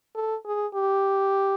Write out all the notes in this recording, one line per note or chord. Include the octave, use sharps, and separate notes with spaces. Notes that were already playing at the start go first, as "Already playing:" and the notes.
A4
G#4
G4